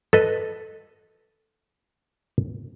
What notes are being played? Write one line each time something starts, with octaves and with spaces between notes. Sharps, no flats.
A4 B4 D#5